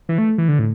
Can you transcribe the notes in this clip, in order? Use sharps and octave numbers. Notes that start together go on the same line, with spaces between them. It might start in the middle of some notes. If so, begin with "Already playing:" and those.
E3
A3
E3
D3
A2